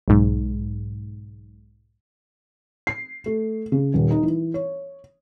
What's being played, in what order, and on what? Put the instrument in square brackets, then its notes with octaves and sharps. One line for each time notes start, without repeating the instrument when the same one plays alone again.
[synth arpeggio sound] B1 G#2
[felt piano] C7
A3
C#3
D#1
D#4
E3
C#5